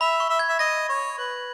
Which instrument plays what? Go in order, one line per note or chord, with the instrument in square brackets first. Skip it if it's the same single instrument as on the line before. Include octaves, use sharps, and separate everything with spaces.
[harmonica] E5 [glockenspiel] B5
[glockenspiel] C#6
[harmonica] E5
[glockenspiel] G#6
[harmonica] E5
[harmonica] D#5 [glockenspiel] A#6
[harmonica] C#5
B4